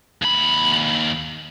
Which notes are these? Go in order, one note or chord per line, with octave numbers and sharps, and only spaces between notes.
D#2 B5